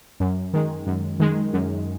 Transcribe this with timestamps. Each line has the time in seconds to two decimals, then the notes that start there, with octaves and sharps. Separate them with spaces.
0.20 F#2
0.53 D#3 G#3
0.87 F#2
1.20 D#3 G#3
1.53 F#2